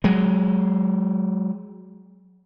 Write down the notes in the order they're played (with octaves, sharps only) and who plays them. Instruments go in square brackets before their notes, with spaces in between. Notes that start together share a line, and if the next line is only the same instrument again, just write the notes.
[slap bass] F#3 G#3